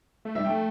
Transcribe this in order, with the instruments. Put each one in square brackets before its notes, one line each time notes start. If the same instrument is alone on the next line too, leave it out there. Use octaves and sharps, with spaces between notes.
[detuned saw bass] A3
[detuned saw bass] G3 [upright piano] E5
[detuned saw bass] A3 [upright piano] G5